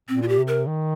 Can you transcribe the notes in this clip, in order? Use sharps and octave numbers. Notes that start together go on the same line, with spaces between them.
A#2 C4
F4
G4
C3
A#4
D#3